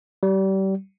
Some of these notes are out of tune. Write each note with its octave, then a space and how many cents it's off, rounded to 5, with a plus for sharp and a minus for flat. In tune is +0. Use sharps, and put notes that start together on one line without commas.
G3 -30